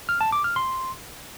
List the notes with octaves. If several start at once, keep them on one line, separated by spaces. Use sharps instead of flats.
F6
A5
D6
F6
C6